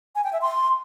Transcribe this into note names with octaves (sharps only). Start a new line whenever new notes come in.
G#5
G5
E5
C6